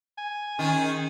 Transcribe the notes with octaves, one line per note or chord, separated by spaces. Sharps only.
G#5
D#3 C#4 G#4